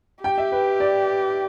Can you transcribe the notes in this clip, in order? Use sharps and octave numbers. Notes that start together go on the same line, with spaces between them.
G4 G5
E5
B4
D5